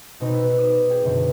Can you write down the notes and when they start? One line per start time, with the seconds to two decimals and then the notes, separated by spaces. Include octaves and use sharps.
0.20 B2 C4 D#4 B4
0.33 E6 F#6 B6
0.57 D6 D#6 D#7 E7
0.90 G4 G#4
1.04 F#2 B2 D3 C4